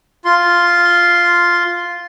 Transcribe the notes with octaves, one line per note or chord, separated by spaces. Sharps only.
F4 C6